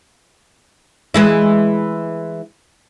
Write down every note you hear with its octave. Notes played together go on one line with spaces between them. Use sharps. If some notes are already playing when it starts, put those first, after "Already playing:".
E3 G#3 E4